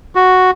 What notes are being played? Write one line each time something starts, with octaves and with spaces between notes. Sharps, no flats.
F#4